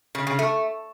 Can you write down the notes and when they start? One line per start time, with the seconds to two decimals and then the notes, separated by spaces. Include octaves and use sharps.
0.15 C#3
0.27 C#3
0.39 A3